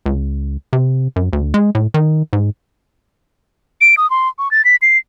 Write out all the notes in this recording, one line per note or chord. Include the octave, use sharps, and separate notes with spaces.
C#2
C3
F#2
D2
G#3
A2
D#3
G#2
D7
D#6
C6
C#6
A6
B6
C7